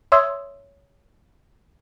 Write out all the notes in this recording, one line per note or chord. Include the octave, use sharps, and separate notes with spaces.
C#5 E5 C6 D#6 E6 G#6